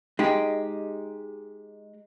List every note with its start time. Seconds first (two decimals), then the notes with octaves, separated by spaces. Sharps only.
0.19 G#3 D#4 G4